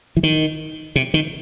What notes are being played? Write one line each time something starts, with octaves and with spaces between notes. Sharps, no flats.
E3
D#3
C3
D#3